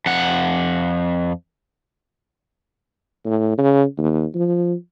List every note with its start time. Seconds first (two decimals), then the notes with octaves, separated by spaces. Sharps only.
0.06 F2 F#5
3.25 A2
3.58 C#3
3.98 D#2
4.35 F3